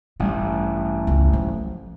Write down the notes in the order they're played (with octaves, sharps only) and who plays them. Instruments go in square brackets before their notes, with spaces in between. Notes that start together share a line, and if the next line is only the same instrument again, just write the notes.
[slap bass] A1 G2 [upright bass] G3
[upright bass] C#2
F3 F#3